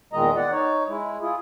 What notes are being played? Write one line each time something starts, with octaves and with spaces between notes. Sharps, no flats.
E2 A#2 D#3 G#3 D#5 A#5
D5 F#5
D#4 C#5
G#3 E4
E4 F4 G#4